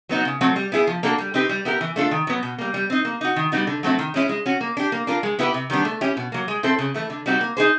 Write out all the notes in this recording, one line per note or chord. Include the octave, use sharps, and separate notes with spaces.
F#3 B3 D#4 F#4
C#3
F#3 A3 C4
G3
B3 E4 G#4
F3
A#3 D4 F#4 A4
G3
C4 D#4 G4 B4
G3
B3 E4 G4 A#4
E3
A3 D4 F4 A4
D#3
F#3 B3
B2
G3 A#3
G3
C4 D#4
A#3
D#4 F#4
D#3
G3 B3 D#4 F#4
D3
F#3 A3 C4 E4
D#3
G#3 C#4 E4
G#3
C#4 F#4
A#3
D4 G4
A#3
D4 F4 A#4
G#3
B3 E4 G4 B4
C3
D#3 G3 B3 D4
A3
C#4 E4 G4
B2
F#3 A#3
G#3
C4 E4 A4 C5
C#3
E3 A3
D3
G3 C4 D#4 F#4
A#3
D#4 G#4 C5